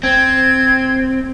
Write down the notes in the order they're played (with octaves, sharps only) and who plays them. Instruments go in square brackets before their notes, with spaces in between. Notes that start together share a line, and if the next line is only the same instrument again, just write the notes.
[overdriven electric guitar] C4 [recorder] G#6